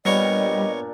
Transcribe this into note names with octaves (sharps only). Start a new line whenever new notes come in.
A#2 G3 B3 D4 A#4 C#5 D#5